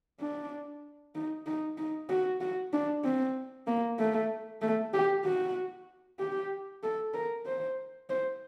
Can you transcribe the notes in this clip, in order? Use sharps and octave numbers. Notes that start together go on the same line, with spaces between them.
D4
D#4
D#4
D#4
F#4
F#4
D4
C4
A#3
A3
A3
G4
F#4
G4
A4
A#4
C5
C5